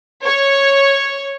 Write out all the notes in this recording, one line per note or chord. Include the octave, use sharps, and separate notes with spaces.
C#5